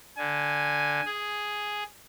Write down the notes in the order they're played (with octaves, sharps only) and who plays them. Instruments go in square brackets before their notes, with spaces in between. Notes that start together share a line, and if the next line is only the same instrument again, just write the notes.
[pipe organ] D3 [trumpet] G#5
[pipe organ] G#4